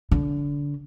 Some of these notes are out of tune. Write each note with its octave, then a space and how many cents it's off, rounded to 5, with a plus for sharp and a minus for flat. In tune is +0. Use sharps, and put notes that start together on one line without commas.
D3 -25